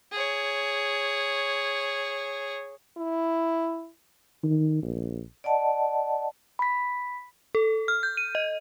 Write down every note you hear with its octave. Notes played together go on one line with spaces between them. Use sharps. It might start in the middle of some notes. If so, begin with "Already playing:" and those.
G#4 C#5
E4
D#3
A#1
D5 D#5 F#5 A5
B5 B6
A4
F6
G6
D#7
D#5